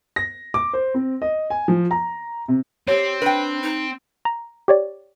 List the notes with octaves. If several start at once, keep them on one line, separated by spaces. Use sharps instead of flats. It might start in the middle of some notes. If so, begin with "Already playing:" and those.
A#6
D6
C5
C4
D#5
G#5
F3
A#5
C3
C4 G4 C#5
D4 B4 G5
D#4
A#5
G4 C#5 D5